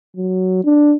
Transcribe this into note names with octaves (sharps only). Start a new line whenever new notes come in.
F#3
D4